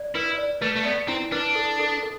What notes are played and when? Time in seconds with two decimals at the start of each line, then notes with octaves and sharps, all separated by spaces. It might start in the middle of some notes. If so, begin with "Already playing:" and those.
Already playing: D5
0.15 E4 B4
0.38 D5
0.61 A3 B4
0.76 A3
0.85 B3 D5
1.08 C4 E4
1.32 D4 B4
1.55 A4
1.80 A4
2.03 A4